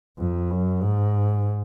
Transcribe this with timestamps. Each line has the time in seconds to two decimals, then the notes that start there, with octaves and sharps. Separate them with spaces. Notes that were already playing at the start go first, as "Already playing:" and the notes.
0.18 F2
0.50 F#2
0.82 G#2